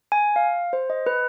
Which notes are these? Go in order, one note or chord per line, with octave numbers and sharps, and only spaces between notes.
G#5
F5
C5
D#5
B4